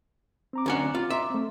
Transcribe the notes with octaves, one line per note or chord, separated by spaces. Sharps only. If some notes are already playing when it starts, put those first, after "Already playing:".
C4 A#5 D6
D2 C#4 F#5
F4
E5 A#5 C6 D6
A3 C4